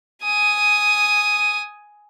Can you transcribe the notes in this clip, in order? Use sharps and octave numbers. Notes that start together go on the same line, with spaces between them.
G#5 D#6